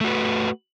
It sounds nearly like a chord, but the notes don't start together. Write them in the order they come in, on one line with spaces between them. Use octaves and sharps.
A3 F#4 B4